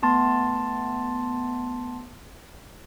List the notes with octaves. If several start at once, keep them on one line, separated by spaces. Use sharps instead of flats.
A3 B3 A5 C6 A6